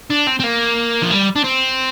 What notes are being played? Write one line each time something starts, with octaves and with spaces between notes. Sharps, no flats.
D4
C4
C4
A#3
F3
G3
D4
C4